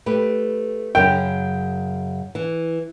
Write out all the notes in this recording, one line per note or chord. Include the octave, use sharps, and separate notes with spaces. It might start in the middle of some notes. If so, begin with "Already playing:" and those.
A3 G4 B4
F#2 C#3 G5
E3